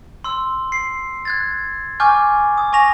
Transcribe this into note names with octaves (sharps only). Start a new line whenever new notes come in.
C6 E6
C7
F#6 G#6 A6
G#5 C#6 D6 F6 G6
D#6
G#5 C#6 A#6 F7